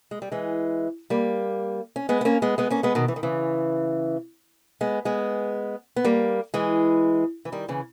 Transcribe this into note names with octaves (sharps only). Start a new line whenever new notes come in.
G#3
G3
E3 G#3
G3 A#3
C#4
G#3 B3
B3
A#3 C#4
G#3 B3
G#3 B3
A#3 C#4
G#3 B3
B2 D#3
E3
D#3
C#3 E3
G#3 B3
G#3 B3
B3
G3 A#3
E3 G#3
E3
D#3 G3
C#3 E3